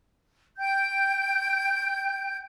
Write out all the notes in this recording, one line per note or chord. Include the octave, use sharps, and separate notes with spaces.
G5 G6